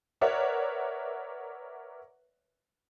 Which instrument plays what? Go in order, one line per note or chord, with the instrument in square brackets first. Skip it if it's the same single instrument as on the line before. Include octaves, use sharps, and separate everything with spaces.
[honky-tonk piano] A#4 B4 C#5 D5 E5 F#5